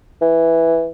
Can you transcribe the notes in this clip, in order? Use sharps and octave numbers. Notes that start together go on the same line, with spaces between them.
E3